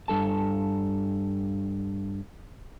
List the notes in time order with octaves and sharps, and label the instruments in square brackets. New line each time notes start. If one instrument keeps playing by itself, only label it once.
[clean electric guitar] G2 A4 A5